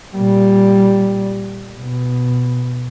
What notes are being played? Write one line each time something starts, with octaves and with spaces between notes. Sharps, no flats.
A#2 G3
B2